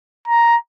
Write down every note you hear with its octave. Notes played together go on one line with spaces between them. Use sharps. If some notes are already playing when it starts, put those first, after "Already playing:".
A#5